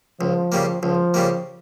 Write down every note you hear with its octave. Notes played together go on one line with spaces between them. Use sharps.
C#2 F3
C#3 G3 A#3
C#2 F3
C#3 G3 A#3